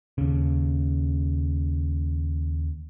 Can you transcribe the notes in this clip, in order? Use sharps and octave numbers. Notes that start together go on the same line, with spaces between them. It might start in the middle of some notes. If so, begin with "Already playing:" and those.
D#2 C#3